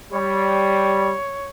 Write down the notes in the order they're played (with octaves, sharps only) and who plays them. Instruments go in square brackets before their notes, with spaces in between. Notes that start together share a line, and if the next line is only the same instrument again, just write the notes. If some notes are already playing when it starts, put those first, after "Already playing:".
[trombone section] G3 [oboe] C#5